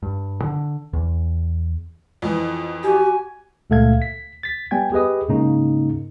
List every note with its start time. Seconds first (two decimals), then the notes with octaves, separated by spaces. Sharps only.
0.03 G2
0.42 D3
0.93 E2
2.22 F2 E3
2.83 F#4 G4 G#5
3.70 C#2 A#2 A3 A4 F5 G#6
4.02 B6
4.43 A6 B6
4.71 G3 B3 G5 G#5 G#6
4.92 G4 G#4 B4 D#5 D#6
5.29 G#2 C#3 A#3 C#4 D#4